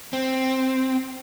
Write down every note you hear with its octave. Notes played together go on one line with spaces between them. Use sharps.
C4